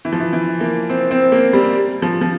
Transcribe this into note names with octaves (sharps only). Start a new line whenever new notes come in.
E3
F3
E3
E3
A#3
C4
C4
A#3
G3
F3
F3